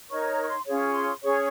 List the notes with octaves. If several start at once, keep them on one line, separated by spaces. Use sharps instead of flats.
D#4 A#4 C#5 C#6
A#5
C#6
C6
C#4 F4 G#4 C#5
C6
C#4 G#4 C#5 C#6